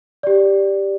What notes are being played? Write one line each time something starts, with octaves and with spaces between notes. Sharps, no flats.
G4 D5